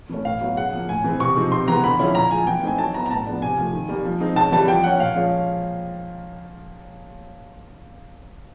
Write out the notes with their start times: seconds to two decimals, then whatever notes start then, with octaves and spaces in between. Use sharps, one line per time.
0.09 E3 A3 C#4
0.25 A2 F5
0.41 F#3 B3 E4
0.57 C#3 F#5
0.73 F3 A#3
0.89 A2 G#5
1.04 E3 G#3 C4
1.20 C3 C#6
1.36 F3 G#3 C4 D#4
1.52 C3 C6
1.68 E3 G#3 B3 A#5
1.84 D3 B5
1.99 F3 G#3 C#4 E4
2.15 A#2 A#5
2.31 F3 G#3 G#5
2.47 E3 G5
2.63 A3 C4 D#4 G#5
2.78 F#3 A5
2.94 B3 E4 A#5
3.06 A#5
3.11 A2 A5
3.26 F3 G#3 B3 D4
3.42 C3 G#5
3.57 F3 A3
3.73 D#3
3.89 G3 A#3
4.05 F3
4.20 G#3 C4 D#4
4.36 C#3 A5
4.52 E3 G3 A5
4.68 F3 G5
4.84 A#3 C#4 F#5
5.00 A#2 F5
5.16 F3 G#3 C#4